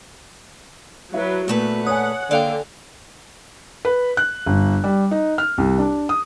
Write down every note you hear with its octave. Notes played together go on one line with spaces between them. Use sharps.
F#3 E4 B4
A#2 A3 B3 F#4 B4
C#5 F#5 G#5 D#6
D3 A#3 D5 F5 G5
B4
F#6
G1
G3
D#4
F6
C2
D4
D#6